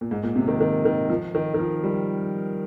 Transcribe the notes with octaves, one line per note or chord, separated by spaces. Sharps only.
A#2
G#2
A#2
C3
D#3
D#3
D#3
F3
D#3
D#3
F3
G3